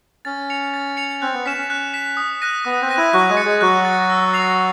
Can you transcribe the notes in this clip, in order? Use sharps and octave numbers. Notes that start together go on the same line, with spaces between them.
C#4 A6
C#7 F7
A6
C#7 F7
C4 F#6
B3
C#4 B6 E7
C#4
F#6
B6 E7
D#6
F#6 A#6 D#7
B3 D#6
C4
F#6 A#6 D#7
E4
F#3 F#4 F#6
G#3 G#4
A6 C#7
G#3 G#4
F#3 F#4 F#6
A6
C#7
E6
A6 C7 F7